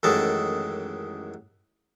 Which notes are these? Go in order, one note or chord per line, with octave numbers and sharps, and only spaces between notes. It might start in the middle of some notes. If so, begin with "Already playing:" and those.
A1 F#2 D#3 G#3 A4 A5